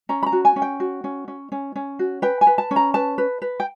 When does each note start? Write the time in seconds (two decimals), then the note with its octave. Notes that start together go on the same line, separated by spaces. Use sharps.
0.09 C#4 A#5
0.23 B5
0.26 A#5
0.32 F#4
0.45 G#5
0.56 C#4
0.62 G5
0.80 F#4
1.04 C#4
1.28 C#4
1.52 C#4
1.76 C#4
1.99 F#4
2.22 B4 G5
2.41 G#5
2.47 B4
2.58 A5
2.71 C#4
2.76 A#5
2.94 B4 A5
3.18 B4
3.42 B4
3.60 G5